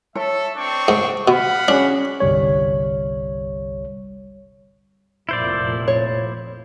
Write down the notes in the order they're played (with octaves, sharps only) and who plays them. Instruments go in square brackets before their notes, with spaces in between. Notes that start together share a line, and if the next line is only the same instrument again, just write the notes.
[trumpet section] A4 E5 [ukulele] C#5
[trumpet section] C4 D4 C#6
[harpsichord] G#2
[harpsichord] B2 [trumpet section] F5 F#5 B5
[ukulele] C#4 F#4 G#4 [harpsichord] D4
[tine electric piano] G1 C2 G3 C#5
[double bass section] F1 F2 A#2 [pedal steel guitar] E4 C5 D5
[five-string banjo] C#5